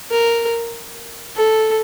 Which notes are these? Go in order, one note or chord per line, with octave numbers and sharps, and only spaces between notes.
A#4
A4